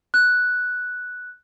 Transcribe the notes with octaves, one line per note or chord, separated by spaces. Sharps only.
F#6